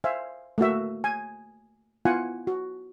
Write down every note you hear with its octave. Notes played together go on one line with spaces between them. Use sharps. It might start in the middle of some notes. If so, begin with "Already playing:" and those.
C5 E5 F5 G#5
A3 A#3 F#4 E5
G#5
B3 E4 F4 F#5 G#5
F#4